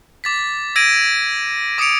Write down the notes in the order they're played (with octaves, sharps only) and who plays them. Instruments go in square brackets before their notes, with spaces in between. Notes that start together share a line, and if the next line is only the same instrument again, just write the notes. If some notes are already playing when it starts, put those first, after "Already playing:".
[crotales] D6 A6 B6
E6 G#6 A#6 D7 D#7
D6 D#6 A#6 C#7 D7 F7